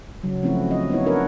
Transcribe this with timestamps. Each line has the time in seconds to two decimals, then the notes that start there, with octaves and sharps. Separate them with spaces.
0.24 C#3 F#3
0.42 F3 A3 C4 C#4 E4 F#4
0.71 D#5
0.90 B3 C#4 D#4 E4 C#5
1.06 D4 F#4 A#4 B4 C#5